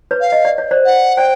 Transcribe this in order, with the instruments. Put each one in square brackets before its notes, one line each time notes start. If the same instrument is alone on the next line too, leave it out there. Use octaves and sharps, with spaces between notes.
[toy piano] B4 C#5
[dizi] F5
[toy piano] D#5
D5
C#5
C5 D5
[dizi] F#5
[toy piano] C5 D5 [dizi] G5